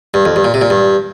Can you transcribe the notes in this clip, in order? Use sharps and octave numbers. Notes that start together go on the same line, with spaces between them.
G2
F2
G2
A#2
C3
A#2
G2